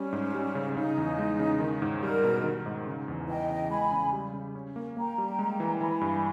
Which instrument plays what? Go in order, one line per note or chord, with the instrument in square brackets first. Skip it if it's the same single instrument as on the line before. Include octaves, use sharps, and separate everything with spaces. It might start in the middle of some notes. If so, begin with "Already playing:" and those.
Already playing: [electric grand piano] G3 [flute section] C#4
[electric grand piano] G#2
G3
C#3
[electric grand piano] C#3 [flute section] D#4
[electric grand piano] E2
G#3
C#3
D#3
G#2
[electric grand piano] G3 [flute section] A#4
[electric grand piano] B2
D#3
G#2
C#3
E2
[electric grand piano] E3 [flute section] D#5 G5
[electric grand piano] C#3
[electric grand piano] G#3 [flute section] G#5 B5
[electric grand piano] C#3
G3
C#3
C#4
A#3
[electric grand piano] A#3 [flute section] G5 A#5
[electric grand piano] G3
G#3
E3
[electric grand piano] E3 [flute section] G#5 B5
[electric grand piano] G2